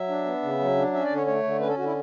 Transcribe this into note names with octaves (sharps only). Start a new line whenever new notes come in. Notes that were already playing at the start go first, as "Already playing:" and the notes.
Already playing: F#3 E5
D4
B3
C#3
F#3
D4
C#4 E5
D5
D3
C#5
A3 C#5
D3
C#4 B4
A4
D3 F#4
E4